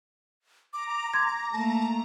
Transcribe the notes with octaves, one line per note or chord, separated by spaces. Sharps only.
A#5 D6
C6 G#6
A3 A#3 A5